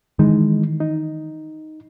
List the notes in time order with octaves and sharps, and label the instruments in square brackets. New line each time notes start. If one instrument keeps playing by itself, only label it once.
[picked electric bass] D#3 E3 [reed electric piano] G#3 D#4
[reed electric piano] D#4